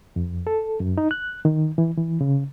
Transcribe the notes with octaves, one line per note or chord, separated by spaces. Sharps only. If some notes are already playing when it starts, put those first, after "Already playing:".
F2
A4
F#2
D#4
F#6
D#3
E3
E3
C#3